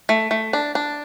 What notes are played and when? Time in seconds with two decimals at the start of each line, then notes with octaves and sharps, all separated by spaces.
0.09 A3
0.31 A3
0.53 D4
0.75 D4